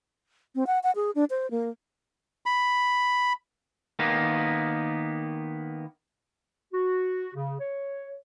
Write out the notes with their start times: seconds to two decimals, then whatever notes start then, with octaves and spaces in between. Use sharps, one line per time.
0.55 C4
0.67 F#5
0.83 F#5
0.96 G#4
1.15 D4
1.30 C5
1.51 A#3
2.46 B5
3.99 D#3 A#3 B3
6.73 F#4
7.35 C#3
7.60 C#5